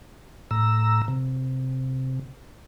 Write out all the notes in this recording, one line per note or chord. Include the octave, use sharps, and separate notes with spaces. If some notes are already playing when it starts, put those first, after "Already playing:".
A2 A#5 E6
C3